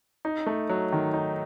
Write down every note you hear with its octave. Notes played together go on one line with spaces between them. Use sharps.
D#4
A3
F#3
D#3
D#4